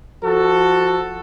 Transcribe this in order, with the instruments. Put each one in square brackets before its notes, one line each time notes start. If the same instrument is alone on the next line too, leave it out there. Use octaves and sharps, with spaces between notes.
[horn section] F3 F#4 A4